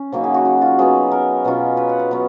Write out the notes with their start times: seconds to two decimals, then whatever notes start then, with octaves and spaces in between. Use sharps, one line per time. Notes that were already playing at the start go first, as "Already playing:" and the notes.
Already playing: C#4
0.12 C#3 F#3 A#3 D#4
0.24 G#4
0.34 F#4
0.45 F#4
0.61 F4
0.79 F#3 B3 D#4 G#4
1.11 A#4
1.44 B2 F#3 C#4 F4
1.77 B4
1.89 F#5
1.99 F5
2.11 F#3 B3